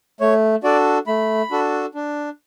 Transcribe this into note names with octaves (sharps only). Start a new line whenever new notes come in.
A3 C#5
D4 F#4 A4 D5
A3 B5
D4 F#4 A4
D4